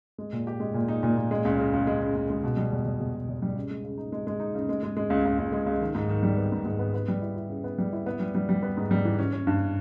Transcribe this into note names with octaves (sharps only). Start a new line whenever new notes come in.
G#3
A#2
G4
G#3
A#2
D#4
A#2
A#2
G#3
C#2
C#3
C#2
G#3
C#3
C#2
G#3
B2
G3
E2
E2
E2
B2
E2
G3
C#3
G#3
C#3
D#4
G#3
G#3
D#4
C#3
G#3
G#3
G#3
C#2
C#2
C#2
G#3
C#2
D#3
G#2
D#3
G3
B3
G#2
G#2
B3
B3
G3
E4
E4
C#3
B3
G3
E4
B3
G3
G3
G3
B3
G#2
G3
E3
C#4
C#4
G2